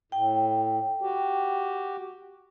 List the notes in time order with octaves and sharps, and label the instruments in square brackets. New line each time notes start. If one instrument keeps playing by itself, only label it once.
[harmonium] A2 [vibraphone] G5
[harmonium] F#4 G4